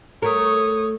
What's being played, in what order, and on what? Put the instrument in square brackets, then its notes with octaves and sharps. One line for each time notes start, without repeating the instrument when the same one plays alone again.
[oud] A3 A#4 [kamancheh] C#5 D#6